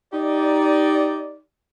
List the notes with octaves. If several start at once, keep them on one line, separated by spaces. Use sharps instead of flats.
D#4 G4 D5